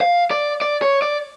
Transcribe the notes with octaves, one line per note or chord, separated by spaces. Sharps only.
F5
D5
D5
C#5
D5